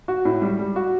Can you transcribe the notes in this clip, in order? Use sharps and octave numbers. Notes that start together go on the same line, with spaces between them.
F#4
A2
G3
G3
F#4